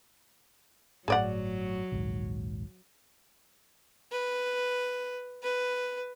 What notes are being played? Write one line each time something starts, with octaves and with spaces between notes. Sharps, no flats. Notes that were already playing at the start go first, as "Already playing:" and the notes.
G1 A2 F#3 G#4 D5 F#5
A#1 D#2 G#2
B4
B4